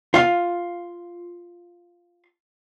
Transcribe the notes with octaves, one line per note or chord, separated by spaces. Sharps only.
F4 F5